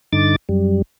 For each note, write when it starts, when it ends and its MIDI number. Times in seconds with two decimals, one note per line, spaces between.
0.13 0.36 43
0.13 0.36 50
0.13 0.36 63
0.13 0.36 86
0.13 0.36 93
0.49 0.82 42
0.49 0.82 55